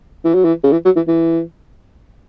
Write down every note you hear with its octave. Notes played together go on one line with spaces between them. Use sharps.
E3
F#3
E3
C#3
E3
F#3
E3
E3